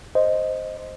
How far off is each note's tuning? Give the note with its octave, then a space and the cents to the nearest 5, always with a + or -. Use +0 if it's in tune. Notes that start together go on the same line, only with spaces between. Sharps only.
C5 +0 D#5 +0